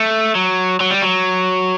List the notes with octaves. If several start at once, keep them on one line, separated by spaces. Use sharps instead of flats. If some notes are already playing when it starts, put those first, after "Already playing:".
Already playing: A3
F#3
F#3
G3
F#3